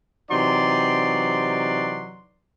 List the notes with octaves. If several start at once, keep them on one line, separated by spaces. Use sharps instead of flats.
C3 E3 F#3 D#4 D5 C6